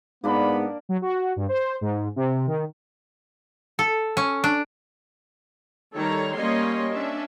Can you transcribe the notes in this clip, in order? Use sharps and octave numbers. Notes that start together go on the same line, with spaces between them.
G#2 A#3 B3 D4 A#4 B5
F#3
F#4
G2
C5
G#2
C3
D#3
A4
C#4
D4
D#3 G3 A4 C#5 A#5
G3 A#3 C#4 C#5 D#5 C6
C#4 D4 E5